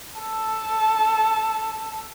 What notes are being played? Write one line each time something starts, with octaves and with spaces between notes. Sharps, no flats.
A4 A5